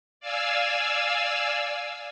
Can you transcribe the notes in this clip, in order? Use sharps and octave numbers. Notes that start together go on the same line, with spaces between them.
D5 F5 G#5 E6